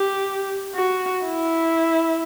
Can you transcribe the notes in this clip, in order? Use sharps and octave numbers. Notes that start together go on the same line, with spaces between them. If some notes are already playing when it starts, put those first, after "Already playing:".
Already playing: G4
F#4
E4